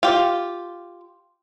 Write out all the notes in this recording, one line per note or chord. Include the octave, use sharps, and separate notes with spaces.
F4 G4